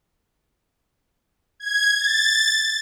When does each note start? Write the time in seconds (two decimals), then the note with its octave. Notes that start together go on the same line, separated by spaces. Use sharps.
1.60 G#6
1.97 A6